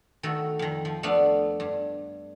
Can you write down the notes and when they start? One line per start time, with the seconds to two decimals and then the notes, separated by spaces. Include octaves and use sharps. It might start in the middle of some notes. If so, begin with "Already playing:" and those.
0.23 D#3 A3 F#4 A4
0.59 F2 D#3
0.85 F3
1.03 A3 B3 D4 F5
1.60 G2